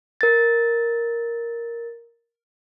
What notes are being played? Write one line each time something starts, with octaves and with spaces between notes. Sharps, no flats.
A#4 A6